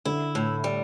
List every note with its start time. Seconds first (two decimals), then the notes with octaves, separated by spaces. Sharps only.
0.05 D3 E4
0.35 A2
0.64 G3